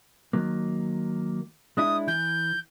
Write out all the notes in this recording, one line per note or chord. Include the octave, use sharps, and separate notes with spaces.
D#3 F#3 A#3
G#3 D4 E4 D#6
E3 G6